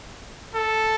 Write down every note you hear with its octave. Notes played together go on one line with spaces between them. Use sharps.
A4